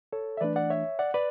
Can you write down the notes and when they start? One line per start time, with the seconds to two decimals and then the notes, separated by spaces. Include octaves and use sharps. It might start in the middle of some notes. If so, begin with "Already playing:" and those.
0.12 A4 C#5
0.37 E5
0.41 E3 A3 D4 B4 D5
0.56 D5 F#5
0.70 C#5 E5
0.99 D5 F#5
1.14 B4 D5